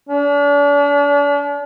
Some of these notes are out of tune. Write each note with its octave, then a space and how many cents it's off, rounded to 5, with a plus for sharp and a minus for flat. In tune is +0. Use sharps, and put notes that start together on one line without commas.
D4 -40